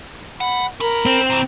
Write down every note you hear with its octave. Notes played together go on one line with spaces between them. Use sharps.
F#5 B5
C#4 A#4 B5
C4
C3 E3 A#5